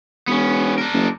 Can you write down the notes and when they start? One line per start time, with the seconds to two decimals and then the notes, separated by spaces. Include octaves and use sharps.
0.28 E1 B3 C#4
0.78 D4 A#4
0.93 F#1